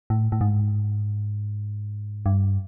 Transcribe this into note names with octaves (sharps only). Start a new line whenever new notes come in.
A2
A2
G#2
G2